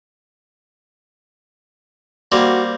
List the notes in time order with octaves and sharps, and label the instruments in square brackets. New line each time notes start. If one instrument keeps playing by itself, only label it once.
[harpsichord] G3 A#3 C4 [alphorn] F#4